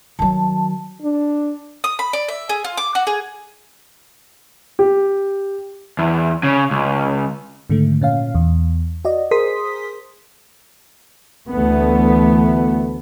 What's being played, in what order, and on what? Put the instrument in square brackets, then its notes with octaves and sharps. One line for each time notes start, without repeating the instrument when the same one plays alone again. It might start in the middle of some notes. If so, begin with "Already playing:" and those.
[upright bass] D#3 F#3 [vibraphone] A5
[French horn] D4
[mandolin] D#6
B5
D5
E5
G#4
F4
D6
F#4
G#4
[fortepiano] G4
[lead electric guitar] E2
C#3
C#2
[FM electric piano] G#2 D3 D#3 A3
A#2 C#4 F5
E2
F#4 D5 D#5
G#4 A#4 C5 C6 D#6 B6
[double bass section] D2 E3 A3 B3